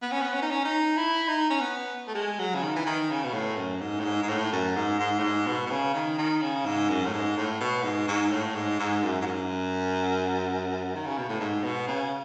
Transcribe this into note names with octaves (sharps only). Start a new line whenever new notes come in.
B3
C#4
B3
C#4
D#4
C#4
D#4
E4
D#4
C#4
B3
A3
G#3
F#3
C#3
D#3
E3
D#3
C#3
B2
A2
F#2
G#2
A2
G#2
G#2
A2
F#2
G#2
G#2
A2
G#2
B2
B2
C#3
D#3
D#3
C#3
G#2
F#2
A2
G#2
A2
B2
G#2
G#2
A2
G#2
G#2
F#2
G#2
F#2
D#3
C#3
B2
A2
G#2
B2
C#3